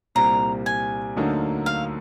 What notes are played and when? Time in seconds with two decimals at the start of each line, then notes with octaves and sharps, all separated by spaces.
0.15 C2 A#2 G3 C4 A#5
0.66 G#5
1.16 D2 D3 F#3 A#3 D#4
1.66 F5